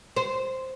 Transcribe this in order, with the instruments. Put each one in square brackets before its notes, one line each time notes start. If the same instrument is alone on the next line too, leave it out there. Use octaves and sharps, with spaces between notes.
[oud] C5